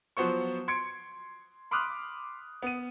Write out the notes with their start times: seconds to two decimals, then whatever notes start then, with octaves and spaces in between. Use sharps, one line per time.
0.17 F3 F#3 B3 C5 C#6
0.68 C6 G#6 C#7 D7
1.71 B5 C6 D6 D#6 F6 F#6
2.62 B3 D#7